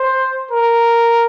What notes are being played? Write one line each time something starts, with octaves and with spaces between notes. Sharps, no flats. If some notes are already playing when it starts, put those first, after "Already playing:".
Already playing: C5
A#4